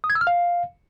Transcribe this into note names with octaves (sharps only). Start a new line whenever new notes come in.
D#6
G#6
E6
F6
F5